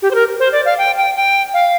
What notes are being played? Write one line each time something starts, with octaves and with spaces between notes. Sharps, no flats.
G4
C5
A#4
C5
D5
F5
G5
G5
G5
F5